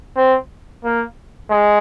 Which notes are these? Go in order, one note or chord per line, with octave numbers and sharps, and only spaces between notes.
C4
A#3
G#3